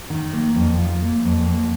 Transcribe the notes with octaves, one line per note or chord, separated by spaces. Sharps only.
D#3
A#3
F2
F4
A#3
F2
A#3